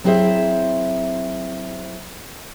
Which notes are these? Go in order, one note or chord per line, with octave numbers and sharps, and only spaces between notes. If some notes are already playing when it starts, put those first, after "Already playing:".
F#3 C4 E4 G#4 C5 E5